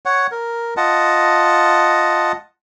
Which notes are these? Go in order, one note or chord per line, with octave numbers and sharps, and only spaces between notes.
C#5 F#5
A#4
F4 D#5 F#5 A5